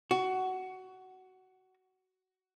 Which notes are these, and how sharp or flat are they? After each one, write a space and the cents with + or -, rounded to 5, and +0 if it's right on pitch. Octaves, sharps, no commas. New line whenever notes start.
F#4 +15